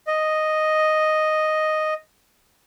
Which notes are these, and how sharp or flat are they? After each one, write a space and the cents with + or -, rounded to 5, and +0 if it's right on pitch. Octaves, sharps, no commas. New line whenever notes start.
D#5 +0